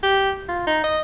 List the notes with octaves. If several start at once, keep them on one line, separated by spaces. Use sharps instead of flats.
G4
F4
D#4
D#5